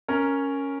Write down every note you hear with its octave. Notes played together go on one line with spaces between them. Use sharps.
C#4 A#4